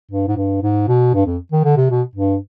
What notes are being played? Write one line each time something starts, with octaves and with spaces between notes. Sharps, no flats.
G2
G#2
G2
G#2
B2
G2
F2
D#3
D3
C3
B2
G2